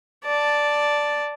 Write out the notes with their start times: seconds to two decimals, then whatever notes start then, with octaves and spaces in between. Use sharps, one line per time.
0.25 D5 A5